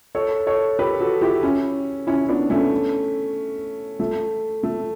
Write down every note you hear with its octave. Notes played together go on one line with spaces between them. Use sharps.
A4 C#5
A4 C#5
G4 B4
F#4 A4
E4 G4
C#4 E4
C#4 E4
B3 D4
A3 C#4
A3
A3